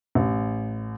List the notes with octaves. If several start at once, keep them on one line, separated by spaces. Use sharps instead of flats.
A1